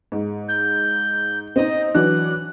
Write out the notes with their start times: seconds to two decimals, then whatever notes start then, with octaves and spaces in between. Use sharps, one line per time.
0.12 G#2
0.48 G6
1.56 C4 D#4 D#5
1.94 E3 F#3 D4 F#6